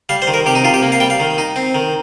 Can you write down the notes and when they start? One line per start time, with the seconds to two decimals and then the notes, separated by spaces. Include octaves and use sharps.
0.09 G3 F5
0.22 C5
0.27 D#3
0.34 A#4
0.46 C3 G4
0.55 D#4
0.64 C3 F4
0.74 G4
0.82 A#3
0.92 F5
1.00 G3 G5
1.10 F5
1.20 D#3
1.38 D#4
1.56 C4
1.75 D#3